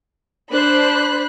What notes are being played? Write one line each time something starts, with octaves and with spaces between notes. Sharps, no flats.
D4 C5 B5 F#6